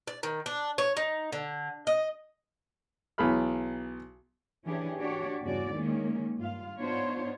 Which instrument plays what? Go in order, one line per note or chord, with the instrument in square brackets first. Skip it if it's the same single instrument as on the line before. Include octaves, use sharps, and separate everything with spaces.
[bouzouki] D5
D#3
D4
C#5
D#4
D3
D#5
[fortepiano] B1 E3 G#4 B5 F6
[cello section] E3 C#4 D4 G4 G#4
D4 F#4 G4 C#5 D5
E2 G2 C#3 C#4 F#4 D5
D#3 G#3 A#3 C#4
G2 F4 F5
B3 D4 D#4 F4 C5 C#5